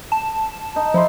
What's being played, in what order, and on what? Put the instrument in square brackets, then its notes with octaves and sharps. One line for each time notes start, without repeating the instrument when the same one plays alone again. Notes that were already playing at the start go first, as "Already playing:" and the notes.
[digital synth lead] A5
[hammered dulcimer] D#4
[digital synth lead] F3 [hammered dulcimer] E4 A4 C6